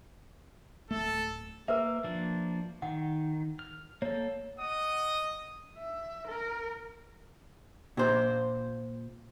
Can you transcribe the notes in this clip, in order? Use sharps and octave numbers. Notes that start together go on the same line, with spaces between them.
D1 A3 A4
A#3 A#4 B4 E5
F3 A#3 D4
D#3 F#5
F6
A#3 A4 C#5
D#5 F#5 D#6
E5
A#4
A#2 C5